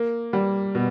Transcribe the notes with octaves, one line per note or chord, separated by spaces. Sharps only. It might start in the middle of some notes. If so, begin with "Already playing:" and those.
Already playing: A#3
G3
B2